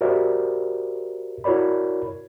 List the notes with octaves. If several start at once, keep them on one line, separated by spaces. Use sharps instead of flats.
F#4 G4 A#4 C5 D5 E5
E4 F#4 A#4 C#5 D5 B5